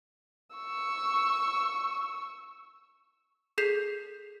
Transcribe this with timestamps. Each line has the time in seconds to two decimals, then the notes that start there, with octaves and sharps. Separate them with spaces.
0.56 C#6 E6
3.58 G#4 A4 G6 B6 C7 F7